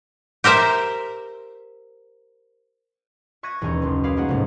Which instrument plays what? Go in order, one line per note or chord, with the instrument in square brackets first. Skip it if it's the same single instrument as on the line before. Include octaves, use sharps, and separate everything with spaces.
[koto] G4 A#4 C5 E5
[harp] E5 C#6 F#6 G#6 A#6 D#7
E1 D#2 C#4 G#5 A#5 G6
F#1 B1 C6
G#4 C#5 F5 B5 D6
G#3 A#3 D#4 G#4 C#5 F#5
F1 B1 G#2